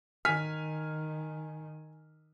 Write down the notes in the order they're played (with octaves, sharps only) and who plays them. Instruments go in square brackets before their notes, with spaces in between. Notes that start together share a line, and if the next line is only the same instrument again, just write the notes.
[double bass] D#3 [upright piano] G#5 F6 B6